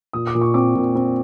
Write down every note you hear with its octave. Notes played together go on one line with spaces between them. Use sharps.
A#2 D#6
D6
A#2
C#6
C4 D6
A#2
C4